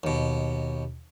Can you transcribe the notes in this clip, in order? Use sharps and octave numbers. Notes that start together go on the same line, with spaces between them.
D#2 B2